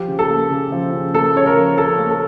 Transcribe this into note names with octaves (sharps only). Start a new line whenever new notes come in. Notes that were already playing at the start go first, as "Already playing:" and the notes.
Already playing: F3 G4
C#3
A4
A#3
C#3
F3
C#3
A#3 A4
C#3 C#5
A#4
F3
C#3 A4
A#3
A4